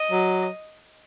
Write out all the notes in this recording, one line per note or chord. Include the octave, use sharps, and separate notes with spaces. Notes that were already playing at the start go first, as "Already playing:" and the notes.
Already playing: D#5
F#3